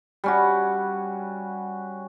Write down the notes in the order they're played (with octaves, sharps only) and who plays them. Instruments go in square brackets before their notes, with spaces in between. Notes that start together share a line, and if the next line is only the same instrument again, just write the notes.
[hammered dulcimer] G3 C#4 F#4